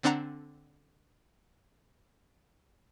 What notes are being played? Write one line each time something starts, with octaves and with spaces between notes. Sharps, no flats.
D3 C4 D4 F#5 A#5